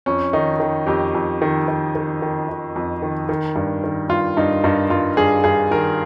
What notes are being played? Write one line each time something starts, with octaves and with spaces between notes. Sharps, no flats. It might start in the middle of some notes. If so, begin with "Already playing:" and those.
F2 C#4
D#3 D#4
D#3
F2 G4
F2
D#3
D#3
D#3
D#3
D#3
F2
D#3
D#3
G2
D#3
G2 F4
G2 D#4
G2 D#4
G2 F4
G2 G#4
G2 G#4
D#3 A#4